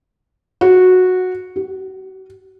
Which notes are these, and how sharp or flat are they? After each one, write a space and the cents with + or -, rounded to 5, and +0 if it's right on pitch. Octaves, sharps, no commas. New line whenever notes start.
F#4 -10
F#4 +40